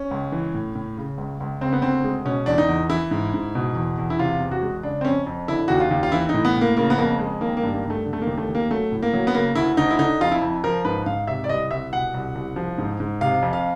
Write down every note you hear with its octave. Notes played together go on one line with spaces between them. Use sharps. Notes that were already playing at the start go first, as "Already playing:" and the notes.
Already playing: C#4
C#2
E3
A2
A2
C#3
C#2
C#2
C#3 C4
B3
D2 C4
G#3
B2 C#4
E2 D4
D#4
E2
E3 E4
G#2
G#2
B2
E2
E2
E4
C3 F4
E2
F#4
G#3
C#3 D4
C4
F2 C#4
F2
D3 E4
D#2 F#4
F4
D#2
F4
E3 E4
D#4
A2
B3
A2
A#3
C#3 A#3
B3
F2 A#3
G#3
D#3 A#3
A#3
G2
A#3
G2
A3
D3
A3
A#3
D#2
A3
D#2
A#3
F#3 A3
A2
A#3
F#3
B3
C#3 A#3
D2 E4
D2 D#4
E4
D3 D#4
F2 F4
E4
F2
F3 A#4
G#2 B4
G#2 F5
C3 E5
D5
C2 D#5
C2 E5
B2 F#5
C2
C2
F3
G#2
G#2
C3 F5
F2
F5